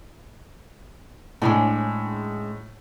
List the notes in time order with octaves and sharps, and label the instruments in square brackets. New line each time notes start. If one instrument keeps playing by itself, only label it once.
[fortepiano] A2 [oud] G#3 C#4 D4